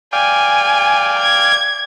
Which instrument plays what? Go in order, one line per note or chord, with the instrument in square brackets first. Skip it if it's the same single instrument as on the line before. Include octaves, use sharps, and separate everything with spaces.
[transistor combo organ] D5 F5 G5 [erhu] G#5
[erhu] G#6